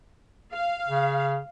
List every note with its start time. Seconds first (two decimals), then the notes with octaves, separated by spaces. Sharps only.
0.52 F5
0.88 C#3